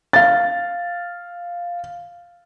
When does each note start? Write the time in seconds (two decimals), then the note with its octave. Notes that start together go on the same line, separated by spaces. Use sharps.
0.13 F5 A6